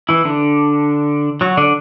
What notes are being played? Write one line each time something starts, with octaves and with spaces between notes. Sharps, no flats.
E3 E4
D3 D4
F#3 F#4
D3 D4